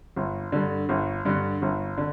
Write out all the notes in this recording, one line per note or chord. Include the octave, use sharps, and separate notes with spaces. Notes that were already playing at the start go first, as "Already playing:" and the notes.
G1
G2 D3
G1
G2 D3
G1
D3